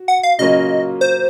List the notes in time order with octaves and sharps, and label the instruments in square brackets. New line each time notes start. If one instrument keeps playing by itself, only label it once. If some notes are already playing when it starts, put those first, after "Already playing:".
Already playing: [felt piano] F#4
[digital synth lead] F#5
F5
[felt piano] C#3 F#3 A#3 C#4 F4 [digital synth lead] D#5
[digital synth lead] C5